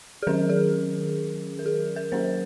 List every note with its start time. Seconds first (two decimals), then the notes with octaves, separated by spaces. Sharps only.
0.22 G#4
0.27 D#3 F#3 C#4 A#4
0.49 G#4
1.59 A#4
1.66 G#4
1.96 A#4
2.12 F#3 A#3 C#4 C5